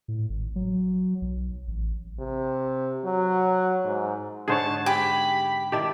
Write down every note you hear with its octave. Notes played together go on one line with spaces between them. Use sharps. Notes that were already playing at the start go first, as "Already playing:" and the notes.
A2
G#1
F#3
B1
A1
C3
F#3
G#2
G#2 D3 B3 G#4 C5 C#5 A5
G4 G#5 B5
D#3 E4 G4 D5 A5